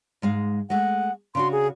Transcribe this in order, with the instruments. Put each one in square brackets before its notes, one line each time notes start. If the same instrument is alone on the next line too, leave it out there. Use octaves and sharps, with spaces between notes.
[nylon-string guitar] G#2 G#3 F5
[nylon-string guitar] G#3 A3 [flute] F#5
[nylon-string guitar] C#3 D4 F#4 [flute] C6
[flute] G#4